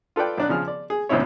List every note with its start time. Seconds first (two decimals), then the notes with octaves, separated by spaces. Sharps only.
0.16 F4 A4 B4 D5 G5
0.37 B1 D4 F#6
0.49 C#3 F3 G#4 F6
0.68 D5
0.90 G#4
1.09 G#1 D2 B2 C#4 E4 C#5